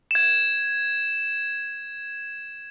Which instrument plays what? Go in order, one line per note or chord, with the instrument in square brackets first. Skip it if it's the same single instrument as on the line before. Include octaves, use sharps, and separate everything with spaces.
[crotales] G#6 E7